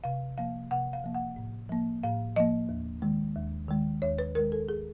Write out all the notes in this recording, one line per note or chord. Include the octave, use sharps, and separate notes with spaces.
C3 F5
F3 A#3 F5
C3 F#5
F5
F3 A#3
F#5
A2
F3 A#3
A2 F5
F3 A#3 D#5
D#2
D#3 G#3
D#2
D#3 G#3
D#2 C#5
B4
D#3 G#3 A#4
A4
G#4